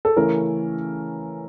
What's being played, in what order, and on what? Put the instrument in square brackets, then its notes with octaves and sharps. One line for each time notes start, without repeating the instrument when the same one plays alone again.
[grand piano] A4
C#3 E3 A3 C#4 A#4